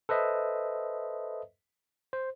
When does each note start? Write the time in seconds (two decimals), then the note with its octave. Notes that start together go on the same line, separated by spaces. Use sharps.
0.09 A4 B4 C5 D#5 E5
2.13 C5